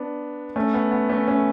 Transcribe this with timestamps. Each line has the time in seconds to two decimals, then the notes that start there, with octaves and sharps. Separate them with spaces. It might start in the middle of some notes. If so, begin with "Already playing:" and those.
Already playing: B3 D4
0.56 A3 C#4
0.74 B3
0.91 B3
1.09 A3 C#4
1.28 A3 C#4